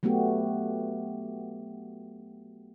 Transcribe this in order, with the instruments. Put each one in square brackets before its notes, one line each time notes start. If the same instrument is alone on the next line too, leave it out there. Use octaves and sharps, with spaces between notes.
[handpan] F#3 A3 B3 F#4 G4